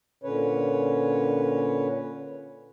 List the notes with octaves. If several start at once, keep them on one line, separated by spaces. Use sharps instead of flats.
A#2 D3 C#4 B4 C#5